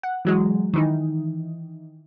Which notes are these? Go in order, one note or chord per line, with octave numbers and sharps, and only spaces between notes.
F#5
E3 F#3 G#3
D#3 E3 D#4